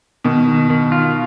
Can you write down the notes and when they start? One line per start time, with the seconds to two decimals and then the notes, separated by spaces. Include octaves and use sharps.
0.25 B2 D#3
0.47 D#3
0.70 D#3
0.92 F4